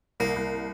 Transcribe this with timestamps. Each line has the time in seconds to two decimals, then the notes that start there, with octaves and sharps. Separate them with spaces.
0.20 C2 A#3
0.36 C2